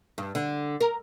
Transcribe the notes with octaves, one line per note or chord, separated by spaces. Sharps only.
G2
D3
A#4